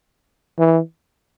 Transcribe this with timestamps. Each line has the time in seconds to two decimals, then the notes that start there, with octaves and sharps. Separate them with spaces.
0.58 E3